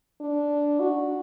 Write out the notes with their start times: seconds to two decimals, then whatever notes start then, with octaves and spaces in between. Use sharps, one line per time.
0.21 D4
0.80 F#4